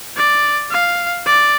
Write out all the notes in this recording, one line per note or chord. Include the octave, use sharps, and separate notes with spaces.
D5
F5
D5